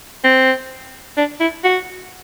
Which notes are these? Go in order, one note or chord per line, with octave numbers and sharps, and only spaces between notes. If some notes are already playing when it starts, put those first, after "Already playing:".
C4
D4
E4
F#4